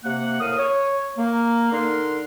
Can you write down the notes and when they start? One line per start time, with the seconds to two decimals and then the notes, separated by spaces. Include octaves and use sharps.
0.04 C3 A#3 F#5
0.40 A2 A#4 F5 D#6
0.58 C#5
1.18 A#3
1.72 D3 D#4 A4 A#4 F#5 C6